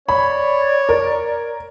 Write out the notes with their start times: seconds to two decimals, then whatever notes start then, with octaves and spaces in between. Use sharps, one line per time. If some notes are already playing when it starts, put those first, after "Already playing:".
0.09 C#5 D5 B5
0.89 A#4